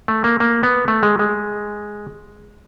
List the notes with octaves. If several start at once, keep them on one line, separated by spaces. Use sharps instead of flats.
A3
A#3
A#3
B3
A3
G#3
G#3